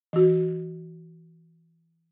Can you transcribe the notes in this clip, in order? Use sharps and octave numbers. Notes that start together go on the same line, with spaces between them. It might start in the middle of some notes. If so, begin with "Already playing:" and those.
E3 F#4